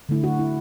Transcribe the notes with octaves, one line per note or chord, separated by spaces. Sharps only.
D3 A3 E4
F#4
E4